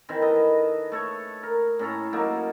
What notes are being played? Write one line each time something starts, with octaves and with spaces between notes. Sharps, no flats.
D#3 E3 C4
A4 B4 D#5
A3 A4 C#5
A#4
A2 C#4 A4 A#5
F#3 A#3 D#4 A4